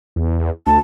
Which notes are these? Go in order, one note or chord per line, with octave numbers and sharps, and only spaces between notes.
E2
D2 A5